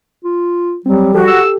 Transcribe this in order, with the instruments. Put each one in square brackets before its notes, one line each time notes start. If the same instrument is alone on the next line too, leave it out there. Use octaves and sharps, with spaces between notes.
[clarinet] F4
[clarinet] F#3 [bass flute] G3 [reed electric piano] C4
[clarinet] F3 [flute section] F#4 [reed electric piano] G4 A4
[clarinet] E6